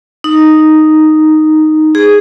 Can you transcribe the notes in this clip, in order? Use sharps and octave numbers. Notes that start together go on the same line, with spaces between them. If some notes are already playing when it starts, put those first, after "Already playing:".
D#4
G#4